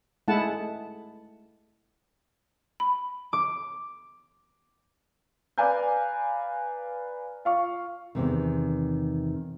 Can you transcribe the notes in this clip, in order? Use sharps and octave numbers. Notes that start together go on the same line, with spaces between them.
G#3 A3 E4 F#5 A5
B5
D6
B4 D5 F5 G#5 A#5 G6
F4 F5 C#6
E2 C3 D#3